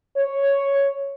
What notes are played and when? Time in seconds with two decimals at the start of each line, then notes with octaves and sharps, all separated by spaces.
0.17 C#5